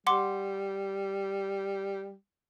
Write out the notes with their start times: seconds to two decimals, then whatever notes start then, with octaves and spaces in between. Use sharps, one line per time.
0.07 G3 F#5 C6 D6